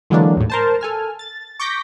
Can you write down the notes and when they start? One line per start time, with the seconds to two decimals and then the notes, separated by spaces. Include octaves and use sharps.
0.10 D3 E3 F#3 G#3 A#3 D4
0.37 D#2 A2
0.50 A#4 C5 A5
0.81 A4 G#5 F6
1.19 A6
1.60 C#6 D6 G6 A#6 B6